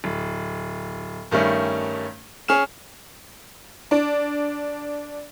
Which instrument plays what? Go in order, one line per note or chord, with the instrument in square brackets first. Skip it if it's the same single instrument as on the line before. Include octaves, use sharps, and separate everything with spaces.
[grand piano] D1
G2 D#3 G3 A3 C#4
C#4 G#4 F6 E7
[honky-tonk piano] D4